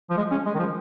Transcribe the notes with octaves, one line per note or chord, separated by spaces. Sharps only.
F3
G#3
C#4
G#3
D#3
F3